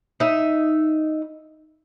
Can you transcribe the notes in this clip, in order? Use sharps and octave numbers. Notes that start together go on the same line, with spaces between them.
D#4 E5